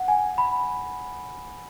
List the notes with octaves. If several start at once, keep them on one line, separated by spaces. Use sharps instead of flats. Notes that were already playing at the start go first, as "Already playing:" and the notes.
Already playing: F#5
G#5
B5